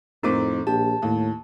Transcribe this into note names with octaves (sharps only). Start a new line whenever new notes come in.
F2 A2 C4 D#4 F4 A#4 D6
A#1 G4 A5
D#2 A2